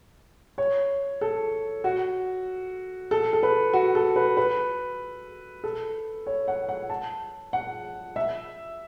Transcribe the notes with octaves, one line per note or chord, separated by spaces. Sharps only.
C#5
A4
F#4
A4
A4
B4
F#4
A4
B4
B4
A4
C#5
F#5
F#5
A5
F#5
E5